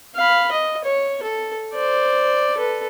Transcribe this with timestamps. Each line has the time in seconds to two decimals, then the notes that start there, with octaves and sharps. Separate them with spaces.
0.16 F5 B5
0.52 D#5
0.84 C#5
1.22 A4
1.74 C5 D5
2.57 A4 B4